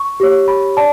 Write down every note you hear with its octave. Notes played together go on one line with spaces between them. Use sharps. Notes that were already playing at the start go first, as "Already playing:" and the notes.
Already playing: C#6
G4 C#5
B5
D5 A5